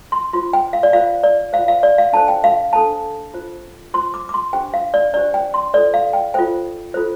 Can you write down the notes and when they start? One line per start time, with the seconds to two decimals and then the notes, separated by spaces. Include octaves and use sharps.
0.12 C6
0.33 F4 C5 C6
0.53 G5
0.73 F5
0.83 D5
0.93 F4 C5 F5
1.24 D5
1.53 F4 C5 F5
1.68 F5
1.83 D5
1.98 F5
2.13 D4 A4 C5 A5
2.28 G5
2.44 F5
2.73 D4 A4 C5 A5
3.34 F4 C5
3.94 F4 C5 C6
4.14 D6
4.29 D6
4.34 C6
4.53 D4 G4 C5 G5
4.74 F5
4.94 D5
5.14 D4 G4 C5 D5
5.34 G5
5.54 C6
5.74 F4 A4 C5 D5
5.94 F5
6.13 G5
6.34 F4 A4 C5 G5
6.94 F4 A4 C5